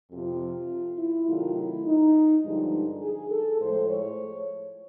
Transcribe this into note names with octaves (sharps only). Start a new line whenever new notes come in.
F2 C3 F3 F4
E4
C3 D#3 F#3 A3 F4
E4
D#4
G2 D3 F3 G#3 D#4
G#4
A4
A2 F3 G#3 C5
C#5